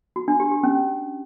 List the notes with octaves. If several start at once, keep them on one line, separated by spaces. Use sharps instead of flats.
F#4
D4
G4
G4
C#4